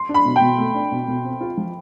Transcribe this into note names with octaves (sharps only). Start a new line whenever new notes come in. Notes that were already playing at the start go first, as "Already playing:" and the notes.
Already playing: C6
D4
B5
B2
G5
B2
A3
D4
B2
B2
C4
F4
F3